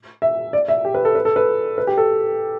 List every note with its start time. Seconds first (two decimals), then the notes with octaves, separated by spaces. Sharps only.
0.22 E5
0.53 D5
0.68 E5
0.85 G4
0.94 B4
1.05 A4
1.15 B4
1.25 A4
1.36 B4
1.78 B4
1.87 G4
1.98 A4